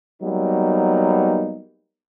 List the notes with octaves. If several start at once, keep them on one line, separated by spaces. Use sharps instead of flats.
F#3 G3 A#3 B3 D#4